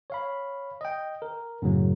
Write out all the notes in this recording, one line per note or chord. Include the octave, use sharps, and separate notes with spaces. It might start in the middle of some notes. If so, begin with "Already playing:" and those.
C#5 F5 B5
D#5 G5
A#4
F#2 A2 C#3 F#3 A#3